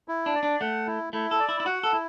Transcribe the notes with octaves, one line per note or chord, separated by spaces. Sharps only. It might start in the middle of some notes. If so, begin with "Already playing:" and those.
E4
D4
D5
D4
A3 F#5
E4
A3 E4
A4
D5
E4
E4
F#4 F#5
A4
E4